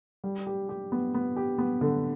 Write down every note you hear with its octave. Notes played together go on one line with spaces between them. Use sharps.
G3
G4
G4
B3
B3
G4
B3
D3